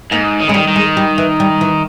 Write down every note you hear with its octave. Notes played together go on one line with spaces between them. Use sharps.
G#2 A#3
D#3
C#3 G#3
D#3 G3
D#3
G#3
G3
E3
G3
E3